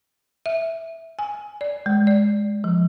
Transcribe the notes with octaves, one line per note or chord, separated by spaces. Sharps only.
E5
G#5
D5
G#3
D5
F3